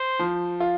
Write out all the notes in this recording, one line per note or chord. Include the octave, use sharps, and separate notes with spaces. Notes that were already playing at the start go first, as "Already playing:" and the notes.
Already playing: C5
F3
F4